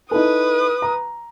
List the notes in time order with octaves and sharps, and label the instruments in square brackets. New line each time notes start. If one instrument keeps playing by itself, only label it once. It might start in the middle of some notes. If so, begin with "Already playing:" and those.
[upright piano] D#4 E4 A4 [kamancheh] B4 D#6
[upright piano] A#5